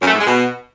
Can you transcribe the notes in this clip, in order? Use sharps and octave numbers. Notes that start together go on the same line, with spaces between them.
F#2
A3
G#2
G#3
B2